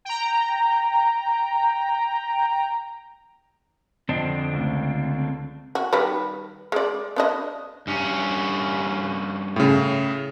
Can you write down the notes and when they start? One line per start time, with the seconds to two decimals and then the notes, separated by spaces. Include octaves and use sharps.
0.05 G5 A#5
4.09 F2 D3 C4 D4 D#5
4.53 C#2 A3
5.75 F#4
5.93 D#3 G3 B4
6.72 G#3 D5
7.16 B3 D4 D#5
7.87 G2 C#4
9.56 A2 C#3